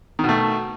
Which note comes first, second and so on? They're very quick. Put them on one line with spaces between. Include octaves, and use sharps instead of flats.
D#3 B2 A3